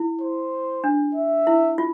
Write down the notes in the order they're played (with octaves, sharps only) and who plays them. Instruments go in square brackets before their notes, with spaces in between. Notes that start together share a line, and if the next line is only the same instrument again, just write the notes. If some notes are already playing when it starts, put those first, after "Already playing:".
Already playing: [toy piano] E4
[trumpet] C5
[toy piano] D4
[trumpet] E5
[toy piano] E4
F4